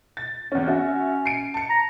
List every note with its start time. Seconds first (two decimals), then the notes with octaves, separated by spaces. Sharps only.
0.17 A6
0.52 E2 C4 C#4
0.68 C#4 F#4 E5
1.26 C7 D7
1.54 A5 C#7
1.69 A#5